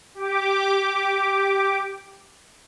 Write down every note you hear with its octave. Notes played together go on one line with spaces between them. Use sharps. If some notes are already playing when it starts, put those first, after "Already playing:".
G4 D6